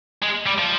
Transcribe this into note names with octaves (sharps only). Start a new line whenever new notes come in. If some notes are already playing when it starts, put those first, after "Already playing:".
G#3
G3
F3